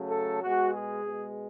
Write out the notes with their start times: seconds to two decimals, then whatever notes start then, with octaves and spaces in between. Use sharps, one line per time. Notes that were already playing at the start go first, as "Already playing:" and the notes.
Already playing: C#3 F#3 A3
0.10 A4
0.42 B2 G#3 F#4
0.73 G#4
1.05 B2 G#3